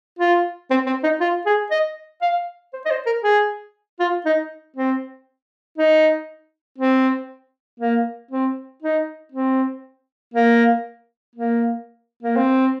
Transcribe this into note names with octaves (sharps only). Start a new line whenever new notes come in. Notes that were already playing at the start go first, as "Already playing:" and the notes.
F4
C4
C4
D#4
F4
G#4
D#5
F5
C5
D#5
C5
A#4
G#4
F4
D#4
C4
D#4
C4
A#3
C4
D#4
C4
A#3
A#3
A#3
C4